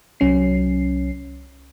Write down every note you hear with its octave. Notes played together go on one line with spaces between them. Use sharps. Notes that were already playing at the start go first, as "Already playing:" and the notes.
C2 F#3 C#4 C7